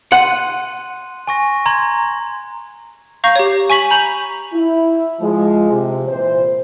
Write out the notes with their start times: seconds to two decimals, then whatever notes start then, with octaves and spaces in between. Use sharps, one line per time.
0.12 F#5 C6 F#6 D#7
1.27 G#5 C#6 A#6
1.66 A#5 C6 G#6
3.24 F5 A#5 C#6 G6 A#6 C7
3.36 G4 C#5
3.70 G#5 C#6 B6 F#7
3.90 A#5 B5 G6 F7 F#7
4.53 E4
5.20 F3 G#3
5.71 C3
6.08 A#2 E3 C5